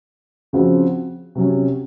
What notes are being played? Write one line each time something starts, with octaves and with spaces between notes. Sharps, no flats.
C#3 F3 C4 F#4
C3 F#3 C#4